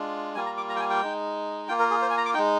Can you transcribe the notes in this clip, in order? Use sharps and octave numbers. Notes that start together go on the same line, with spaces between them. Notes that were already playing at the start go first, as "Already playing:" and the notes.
Already playing: G#3 D4 F4
G3 A#3 F4 G#5
A#5
D6
A#5
G5
G#5
G5
G#3 D#4
A#3 F4 G5
A#4
G#4
C5
G#5
A#5
D6
G#3 D#4 G5